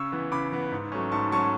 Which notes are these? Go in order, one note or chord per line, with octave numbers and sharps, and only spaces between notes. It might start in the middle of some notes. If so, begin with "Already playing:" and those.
Already playing: C#3 C#6 E6
E3 B3
C#3 B5 D6
E3 B3
G#2
F#3 A3 C#4
G#2 A5 C#6
F#3 A3 C#4 A5 C#6